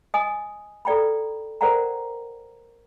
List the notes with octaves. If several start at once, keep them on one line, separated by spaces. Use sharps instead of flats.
D#5 G#5 D#6
A4 B4 D5 G5 A#5 B5
A#4 C5 D5 F#5 G5 A#5